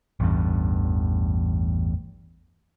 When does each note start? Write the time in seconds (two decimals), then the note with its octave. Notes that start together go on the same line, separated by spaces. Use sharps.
0.20 A1 E2 G2